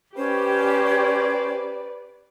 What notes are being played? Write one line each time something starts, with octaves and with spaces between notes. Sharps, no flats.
C#4 G4 B4 C5 D5